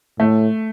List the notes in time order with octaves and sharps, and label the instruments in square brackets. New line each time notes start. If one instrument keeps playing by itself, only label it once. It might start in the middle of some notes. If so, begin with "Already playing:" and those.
[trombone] A2 [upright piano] A3